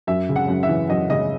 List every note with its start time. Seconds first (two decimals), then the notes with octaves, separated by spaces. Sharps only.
0.07 F#2 E5
0.29 C#3
0.36 F#5
0.48 F#2
0.63 E5
0.69 E3
0.89 F#2 D#5
1.09 C#3 D#5